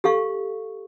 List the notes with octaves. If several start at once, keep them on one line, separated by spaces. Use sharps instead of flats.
G4 A4 F5 C#6